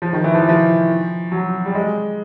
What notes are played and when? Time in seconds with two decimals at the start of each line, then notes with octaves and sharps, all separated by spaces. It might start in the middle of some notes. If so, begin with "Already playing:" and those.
0.02 F3
0.13 D#3
0.24 E3
0.34 F3
0.42 E3
0.49 F3
1.32 F#3
1.66 G3
1.75 G#3